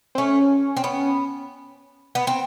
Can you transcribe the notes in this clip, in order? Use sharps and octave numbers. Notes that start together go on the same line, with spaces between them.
C4
A3 C#4
C4
B3
B3
C4